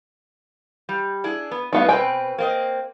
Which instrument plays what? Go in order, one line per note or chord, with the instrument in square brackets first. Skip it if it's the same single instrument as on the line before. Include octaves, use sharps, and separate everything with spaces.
[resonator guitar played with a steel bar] G3
D4 E4 G#4
B3
[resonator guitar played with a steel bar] A2 F3 D#4 [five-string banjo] G3 B3 F5
[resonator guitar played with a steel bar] B2 C4 B4 [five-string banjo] G5 G#5
[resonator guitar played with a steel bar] A#3 C4 D#5